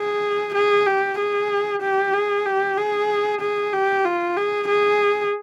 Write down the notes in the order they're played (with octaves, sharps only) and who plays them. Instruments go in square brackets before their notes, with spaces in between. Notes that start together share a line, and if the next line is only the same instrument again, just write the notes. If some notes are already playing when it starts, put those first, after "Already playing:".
Already playing: [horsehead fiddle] G#4
G#4
G4
G#4
G4
G#4
G4
G#4
G#4
G4
F4
G#4
G#4